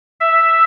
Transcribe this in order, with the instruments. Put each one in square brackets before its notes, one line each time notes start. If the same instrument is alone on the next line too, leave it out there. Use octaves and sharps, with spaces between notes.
[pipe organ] E5